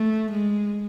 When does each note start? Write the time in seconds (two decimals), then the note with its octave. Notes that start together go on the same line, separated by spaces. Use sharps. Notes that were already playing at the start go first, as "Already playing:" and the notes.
Already playing: A3
0.31 G#3